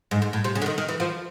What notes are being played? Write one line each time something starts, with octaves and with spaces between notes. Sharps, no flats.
G#2
G#2
A2
C3
C#3
D3
D#3
D#3
E3
F3